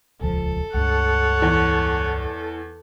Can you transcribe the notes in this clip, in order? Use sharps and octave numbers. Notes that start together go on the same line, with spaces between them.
D#1 C#2 F3 A4
C#2 G2 C#5 F#5
E2